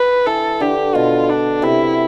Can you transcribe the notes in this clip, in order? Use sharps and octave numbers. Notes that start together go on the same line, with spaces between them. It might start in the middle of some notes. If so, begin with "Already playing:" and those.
Already playing: B4
E3 A4
D3 G4
B2 F4
D4
C3 E4